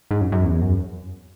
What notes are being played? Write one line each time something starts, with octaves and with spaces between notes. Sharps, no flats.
G#2
F#2
F#2
E2
F#2